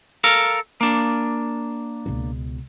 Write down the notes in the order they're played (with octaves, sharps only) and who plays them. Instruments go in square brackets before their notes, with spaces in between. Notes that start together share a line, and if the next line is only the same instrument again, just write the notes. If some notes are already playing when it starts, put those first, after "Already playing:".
[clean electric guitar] A4 A#4 F5
A#3 D4
[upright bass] C#2 B2